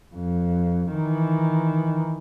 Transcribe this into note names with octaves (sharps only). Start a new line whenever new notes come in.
F2
D#3 E3